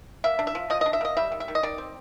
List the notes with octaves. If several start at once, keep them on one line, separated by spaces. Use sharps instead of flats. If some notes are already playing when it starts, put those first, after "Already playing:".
A#3 E5
D4
E5
F3
F3 D#5
D4 D#5
E5
A#3 D#5
G3 E5
D#3
E5
D#3
D#5
D#3 D5
C4